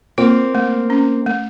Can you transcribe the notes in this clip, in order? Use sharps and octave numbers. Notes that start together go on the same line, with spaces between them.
A#3 C4 F4
A3
C#4
A3